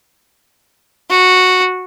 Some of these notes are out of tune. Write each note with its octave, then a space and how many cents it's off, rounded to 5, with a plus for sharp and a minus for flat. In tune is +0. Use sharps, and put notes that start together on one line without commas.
F#4 -5